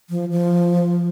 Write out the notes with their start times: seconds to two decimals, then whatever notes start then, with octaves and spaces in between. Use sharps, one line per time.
0.10 F3
0.32 F3